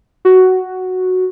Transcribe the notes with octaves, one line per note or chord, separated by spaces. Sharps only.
F#4